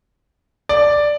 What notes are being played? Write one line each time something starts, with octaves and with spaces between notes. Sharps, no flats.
D5